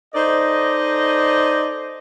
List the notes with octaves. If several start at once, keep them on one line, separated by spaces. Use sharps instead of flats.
D#4 A4 C5 D5 D#5